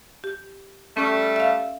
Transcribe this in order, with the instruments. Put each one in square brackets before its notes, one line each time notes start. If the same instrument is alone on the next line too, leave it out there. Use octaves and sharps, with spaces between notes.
[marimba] G4
[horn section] G3 A3 [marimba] C#4 A4 C#6
[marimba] E5 F5